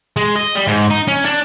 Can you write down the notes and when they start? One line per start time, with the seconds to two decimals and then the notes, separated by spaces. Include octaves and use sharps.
0.17 G#3
0.36 D#5
0.55 G3
0.67 G#2
0.91 D#4
1.08 C#4
1.25 D4